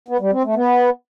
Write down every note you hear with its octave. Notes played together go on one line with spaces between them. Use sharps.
B3
G3
C4
A3
B3